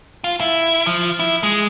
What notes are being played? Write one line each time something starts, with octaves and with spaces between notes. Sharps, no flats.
F4
E4
F3
E4
G#3